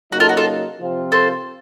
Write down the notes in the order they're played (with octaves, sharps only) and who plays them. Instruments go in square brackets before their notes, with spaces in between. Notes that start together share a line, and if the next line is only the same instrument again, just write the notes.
[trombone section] C#3 F#3 A#3 D#4 [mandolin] F#4
[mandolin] F4 A4
F#4
F4 A4
[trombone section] C3 F3 C4 F4
[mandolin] A4 C5